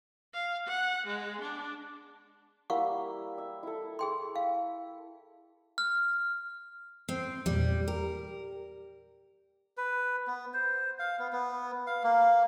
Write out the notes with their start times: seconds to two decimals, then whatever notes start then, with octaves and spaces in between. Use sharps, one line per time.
0.34 F5
0.66 F#5
1.06 G#3
1.41 D4
2.70 G3 A#3 E4 F5 F#5 C#6
3.38 E5
3.63 E4 A4
3.99 G#4 G5 C6
4.36 F5
5.78 F6
7.09 C4 C7
7.46 E2 A#2 G3
7.88 G4 A#4
9.77 B4
10.27 B3
10.54 C5
10.99 F5
11.19 B3
11.33 B3
11.87 F5
12.04 A#3